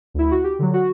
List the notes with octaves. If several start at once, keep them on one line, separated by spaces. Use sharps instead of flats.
D2 E4
F#4
G4
D3 F#3
F#4